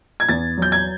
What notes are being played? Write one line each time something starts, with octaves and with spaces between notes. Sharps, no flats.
G#6
E2 A6
F#3 G6
G#6